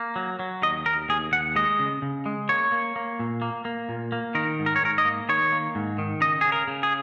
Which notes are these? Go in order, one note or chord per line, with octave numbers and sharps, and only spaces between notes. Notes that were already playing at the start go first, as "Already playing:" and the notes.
Already playing: A#3
F#3
F#3
D#2 D#5
D#2 A#4
D#2 G#4
D#2 F#5
G#3 D#5
C#3
C#3
G#3
A#3 C#5
A#3
A#3
A#2
A#3
A#3
A#2
A#3
D#3 A#4
G#2
A#4
C#5
G#2 A#4
D#5
A#3
D#3 C#5
A#3
G#2
D#3
C#3 D#5
C#3 G#4
A#4
C#3
G#4